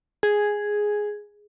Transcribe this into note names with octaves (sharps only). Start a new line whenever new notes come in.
G#4